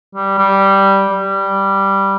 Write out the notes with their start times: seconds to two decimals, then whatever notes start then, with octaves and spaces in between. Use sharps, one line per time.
0.15 G3
0.38 G3
1.10 G3